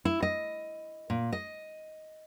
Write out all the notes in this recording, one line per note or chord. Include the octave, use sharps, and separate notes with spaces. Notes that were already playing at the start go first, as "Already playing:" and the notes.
E4
D#5
A#2
D#5